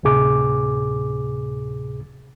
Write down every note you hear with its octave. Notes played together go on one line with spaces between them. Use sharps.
D2 A2 C3 G#4 D6